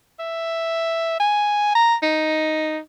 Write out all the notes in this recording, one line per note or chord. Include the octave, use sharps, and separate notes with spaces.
E5
G#5
A#5
D#4